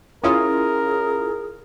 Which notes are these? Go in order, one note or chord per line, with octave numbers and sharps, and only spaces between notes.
C#4 E4 F4 G#4 A#4 D#6